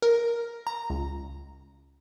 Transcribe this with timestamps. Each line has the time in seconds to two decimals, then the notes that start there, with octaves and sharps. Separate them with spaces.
0.02 A#4
0.67 A#5
0.90 C#2